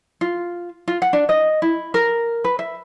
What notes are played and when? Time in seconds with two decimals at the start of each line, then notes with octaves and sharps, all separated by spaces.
0.21 F4
0.88 F4
1.02 F#5
1.13 D4
1.29 D#5
1.62 E4
1.94 A#4
2.44 B4
2.59 E5